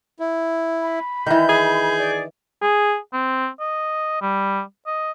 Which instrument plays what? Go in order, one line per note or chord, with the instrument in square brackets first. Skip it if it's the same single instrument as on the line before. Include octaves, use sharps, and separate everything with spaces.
[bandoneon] E4
[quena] B5
[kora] D#3 E3 [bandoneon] G6
[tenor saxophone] G#4
[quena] D5
[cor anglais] G#4
C4
D#5
G3
D#5